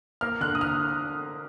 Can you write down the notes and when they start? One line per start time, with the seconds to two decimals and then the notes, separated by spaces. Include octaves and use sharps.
0.21 A#3 F6
0.41 D3 F#6
0.55 D#6
0.61 F6